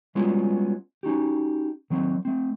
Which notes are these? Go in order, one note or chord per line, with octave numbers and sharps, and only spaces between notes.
G3 G#3 B3 C#4 F4 F#4
C#4 D#4 F#4 G4
D#3 F#3 C4
A3 C4